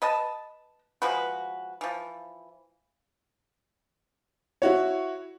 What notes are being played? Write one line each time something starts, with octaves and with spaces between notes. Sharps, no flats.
B4 D#5 A5
F3 G#3 F#4 B4
E3 F3
E4 F#4 C#5